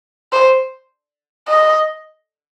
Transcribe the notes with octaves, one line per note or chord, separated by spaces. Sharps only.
C5
D#5